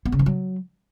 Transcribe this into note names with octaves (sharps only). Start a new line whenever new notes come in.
B3
C#3
E3
F#3